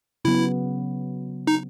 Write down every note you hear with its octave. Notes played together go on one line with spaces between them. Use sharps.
C#3 F#3 B3 E4
D#4